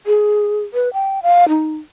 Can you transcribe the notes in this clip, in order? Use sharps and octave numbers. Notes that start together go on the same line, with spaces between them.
G#4
B4
G5
F5
D#4